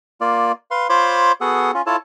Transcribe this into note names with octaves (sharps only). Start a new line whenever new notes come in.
A#3 F4 D5
B4 F5 C6
F4 C5 C#5 B5 C6 D6
B3 F#4 G#4 A4 F#5
C#4 F4
E4 F4 A4 C#5 A5